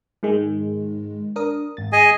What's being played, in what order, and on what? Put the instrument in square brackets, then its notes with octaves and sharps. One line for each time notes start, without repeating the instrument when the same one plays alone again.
[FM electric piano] G#2 D#3 G#3
D4 A#4 D#6
G#1 A6
[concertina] G#4 D#5 G#5